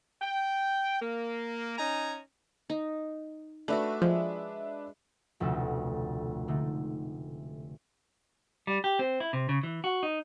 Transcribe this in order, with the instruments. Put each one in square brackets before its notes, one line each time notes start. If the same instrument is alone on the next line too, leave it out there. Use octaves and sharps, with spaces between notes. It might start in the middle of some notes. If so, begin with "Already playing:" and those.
[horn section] G5
A#3
C#4 D#4 G#5 A#5
[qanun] D#4
[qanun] A3 F#4 [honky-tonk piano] D4 B4 E5
[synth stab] F3 [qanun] G#3
[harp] F1 D2 B2 A4 E7
D3 G#3 A3 D#4
[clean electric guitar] G3
G4
C4
E4
C3
C#3
E3
F#4
D#4